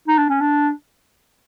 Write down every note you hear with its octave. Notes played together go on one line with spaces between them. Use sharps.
D#4
D4
C#4
D4